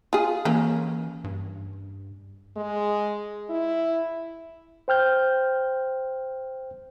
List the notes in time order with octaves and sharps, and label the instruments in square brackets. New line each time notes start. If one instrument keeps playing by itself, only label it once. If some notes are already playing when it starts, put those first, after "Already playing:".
[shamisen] F4 G#4
[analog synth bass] E3 [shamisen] A#3 C#4
[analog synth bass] G2
[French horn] G#3
E4
[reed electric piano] C5 G5 F6 G6